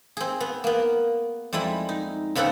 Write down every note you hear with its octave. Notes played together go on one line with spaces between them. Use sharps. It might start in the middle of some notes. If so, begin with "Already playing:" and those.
C4 G#4
B3
A#3 B3
F2 G3 G#3 E4 B5
D#4
G#2 C#3 B3 A4 F#5 G5